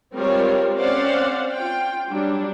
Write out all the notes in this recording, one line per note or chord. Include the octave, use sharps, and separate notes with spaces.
G3 G#3 C4 F4 A#4 C#5
C4 C#4 C5 D5 F5 F#5
F4 G5
F#3 G3 D4